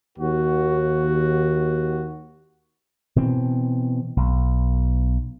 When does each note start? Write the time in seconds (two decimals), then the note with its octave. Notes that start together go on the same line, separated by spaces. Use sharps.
0.18 D#2 F#4
3.16 B2 E3 C4
4.17 B1